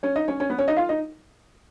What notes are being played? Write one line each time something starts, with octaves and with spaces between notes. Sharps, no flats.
C#4 C#5
D#4 D#5
C#4 C#5
C#4 C#5
B3 B4
C#4 C#5
D#4 D#5
F4 F5
D#4 D#5